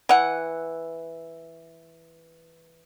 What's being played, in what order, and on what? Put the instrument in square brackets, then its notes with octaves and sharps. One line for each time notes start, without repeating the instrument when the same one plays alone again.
[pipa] E3 F#5